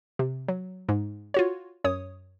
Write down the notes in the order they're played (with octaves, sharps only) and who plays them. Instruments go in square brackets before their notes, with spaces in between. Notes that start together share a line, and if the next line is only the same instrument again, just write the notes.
[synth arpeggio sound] C3
F#3
G#2
F4 F#4 C#5
F#2 C#5 D#6